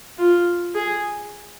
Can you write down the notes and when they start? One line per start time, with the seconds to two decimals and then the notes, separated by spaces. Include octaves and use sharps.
0.18 F4
0.75 G#4